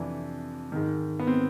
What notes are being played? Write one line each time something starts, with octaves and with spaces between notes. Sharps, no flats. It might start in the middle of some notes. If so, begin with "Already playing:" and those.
Already playing: F2 C3 E3 D4
G#2 D#3
B3
C4